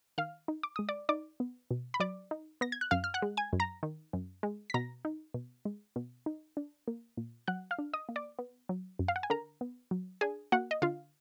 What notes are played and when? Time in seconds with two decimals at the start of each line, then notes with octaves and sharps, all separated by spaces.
0.18 D#3 F5 F6
0.48 D#4
0.63 D6
0.76 G#3 D#6
0.89 D5 D6
1.09 D#4 D5 D6
1.40 B3
1.71 B2
1.94 B5
2.00 F#3 D5 D6
2.31 D#4
2.61 B3 A#6
2.72 G#6
2.81 F#6
2.91 F#2 F5 F6
3.04 F6
3.14 F#5 F#6
3.22 G#3
3.37 G#5 G#6
3.53 F#2
3.60 A#5 A#6
3.83 D#3
4.13 F#2
4.43 G#3
4.70 B6
4.74 B2 A#5 A#6
5.05 D#4
5.34 B2
5.65 G#3
5.96 B2
6.26 D#4
6.57 D4
6.88 A#3
7.17 A#2
7.48 F#3 F#5 F#6
7.71 F5 F6
7.79 D4
7.93 D#5 D#6
8.09 A#3
8.16 D5 D6
8.39 B3
8.69 F#3
8.99 F#2
9.08 F5
9.16 F#5
9.23 G#5
9.30 D3 A#4 A#5
9.61 B3
9.91 F#3
10.21 D4 G#4 G#5
10.52 A#3 F#4 F#5
10.71 D#5
10.82 D3 F4 F5